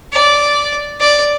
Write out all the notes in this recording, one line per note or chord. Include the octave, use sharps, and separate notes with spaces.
D5
D5